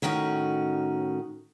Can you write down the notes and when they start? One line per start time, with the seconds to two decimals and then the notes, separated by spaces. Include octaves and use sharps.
0.02 A2 D#3 C#4 D#4 F#4